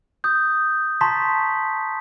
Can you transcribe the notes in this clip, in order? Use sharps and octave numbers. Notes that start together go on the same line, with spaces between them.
D#6 G6
A5 A#5 C6 C#6 A6 B6